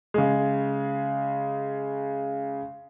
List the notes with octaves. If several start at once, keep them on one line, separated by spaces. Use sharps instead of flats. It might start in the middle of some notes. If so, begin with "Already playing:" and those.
C#3 G#3